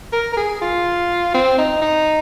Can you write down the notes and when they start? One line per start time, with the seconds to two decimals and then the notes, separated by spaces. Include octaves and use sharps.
0.13 A#4
0.33 A#4
0.37 G#4
0.61 F4
1.34 C4
1.58 D#4
1.81 D#4